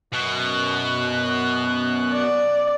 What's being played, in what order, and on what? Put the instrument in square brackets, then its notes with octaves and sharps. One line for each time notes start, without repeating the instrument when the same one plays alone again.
[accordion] F#2 F#6 [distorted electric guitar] B2
[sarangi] D5